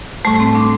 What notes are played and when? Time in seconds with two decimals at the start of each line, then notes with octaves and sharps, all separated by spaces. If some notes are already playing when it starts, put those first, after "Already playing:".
0.25 A2 G3 A3
0.40 C4
0.55 D4